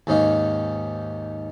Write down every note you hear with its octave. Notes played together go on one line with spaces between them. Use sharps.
D#2 G#2 C#4 D#4 F5